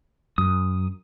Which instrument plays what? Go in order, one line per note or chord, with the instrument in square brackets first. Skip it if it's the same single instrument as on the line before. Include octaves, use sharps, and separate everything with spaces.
[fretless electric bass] F#2 [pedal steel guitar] D#6